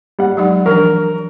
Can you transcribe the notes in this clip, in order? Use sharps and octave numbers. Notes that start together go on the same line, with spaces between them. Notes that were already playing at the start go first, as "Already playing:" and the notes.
G3 F#5
F#3 G#3 D#4
E3 F3 D4 A#4